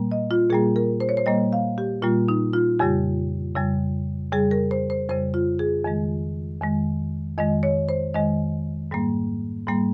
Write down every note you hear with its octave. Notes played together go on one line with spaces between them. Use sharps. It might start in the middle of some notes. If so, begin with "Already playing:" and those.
Already playing: A#2 G3 A#3
D#5
F4
A#2 G3 A#3 G#4
A#4
C5
C#5
C5
A#2 G3 A#3 D#5
F5
G4
A#2 G3 A#3 F4
D#4
F4
F2 C#3 G3 G4
F2 C#3 G3
F2 C#3 G3 G#4
A#4
C5
C5
F2 C#3 G3 C5
F4
G#4
F2 D#3 G#3
F2 D#3 G#3
F2 D#3 G#3 D#5
C#5
C5
F2 D#3 G#3 D#5
G#2 G3 A#3
G#2 G3 A#3